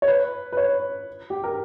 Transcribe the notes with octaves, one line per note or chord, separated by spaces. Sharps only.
C#5
B4
B4
C#5
G4
A#4